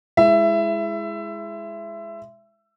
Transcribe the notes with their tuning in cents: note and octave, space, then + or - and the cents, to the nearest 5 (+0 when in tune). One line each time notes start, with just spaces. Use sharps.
G#3 +0 E4 +0 E5 +20